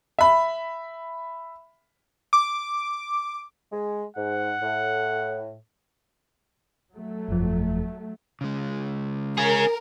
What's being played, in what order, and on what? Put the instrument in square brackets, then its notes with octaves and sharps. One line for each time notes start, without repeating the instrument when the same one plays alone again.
[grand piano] E5 B5
[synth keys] D6
[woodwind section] G#3
[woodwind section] G#2 [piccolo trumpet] F#5
[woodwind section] A2
[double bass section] F#3 A3
[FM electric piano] G1 F2 F3
[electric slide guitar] C#3 G#3
[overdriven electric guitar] C#4 G#4 [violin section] A#4